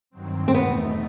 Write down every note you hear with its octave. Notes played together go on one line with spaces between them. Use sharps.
G2 D#3 F#3 C4
C4
E2 B2 A3 B3 D#4